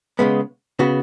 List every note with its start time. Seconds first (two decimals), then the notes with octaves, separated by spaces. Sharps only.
0.19 C#3 G#3 B3
0.79 C#3 B3 F#4